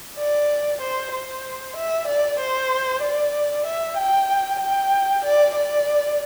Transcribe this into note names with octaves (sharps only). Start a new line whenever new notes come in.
D5
C5
C5
E5
D5
C5
D5
E5
G5
G5
D5
D5